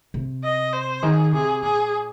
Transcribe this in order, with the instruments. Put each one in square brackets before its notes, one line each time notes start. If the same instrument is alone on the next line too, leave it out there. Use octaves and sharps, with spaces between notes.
[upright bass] C3
[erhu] D#5
C5
[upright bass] D#3 [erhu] G#4
[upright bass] C3 [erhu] G#4
[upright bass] A#2 [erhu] G#4